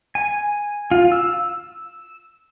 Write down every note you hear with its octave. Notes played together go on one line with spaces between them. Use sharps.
G#5
F4
E6